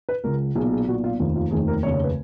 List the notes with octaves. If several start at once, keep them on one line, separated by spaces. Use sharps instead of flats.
B4
C#2 C#3 A#4
B1 A#2 G#4
G#4
B1 A#2 F#4
F4
F1 D#2 D#3 F4
F4
F1 D#2 D#3 G#4
A#4
F1 D#2 C#3 C#5
C#5
B4